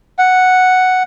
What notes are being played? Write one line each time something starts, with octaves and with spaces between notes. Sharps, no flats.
F#5